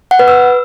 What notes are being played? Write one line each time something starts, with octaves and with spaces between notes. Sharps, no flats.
F#5
B4
E6